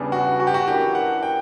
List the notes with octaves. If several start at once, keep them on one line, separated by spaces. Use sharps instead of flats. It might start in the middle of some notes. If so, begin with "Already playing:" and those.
Already playing: E2 C#3 G3 B3 D4
F#4
F#4
G4
F#4
F#2 E3 A#3 D4 G4
F#5
G5